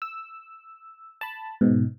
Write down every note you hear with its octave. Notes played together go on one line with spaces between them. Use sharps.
E6
A5 B5
G#2 B2